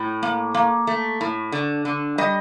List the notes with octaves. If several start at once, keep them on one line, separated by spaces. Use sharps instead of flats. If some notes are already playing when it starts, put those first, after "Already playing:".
Already playing: A2
A#3
A#3
A3
A2
D3
D3
G3 D#5